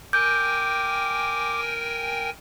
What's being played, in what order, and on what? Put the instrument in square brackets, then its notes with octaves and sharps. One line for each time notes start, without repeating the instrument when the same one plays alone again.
[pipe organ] A#4 G5 G#5 [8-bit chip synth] D6 [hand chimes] G6